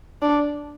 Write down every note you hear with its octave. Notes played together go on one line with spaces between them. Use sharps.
D4